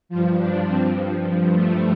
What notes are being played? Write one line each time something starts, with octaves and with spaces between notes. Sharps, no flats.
G2 F3 F4
D4
G2 F3 C4
G2 F3
A3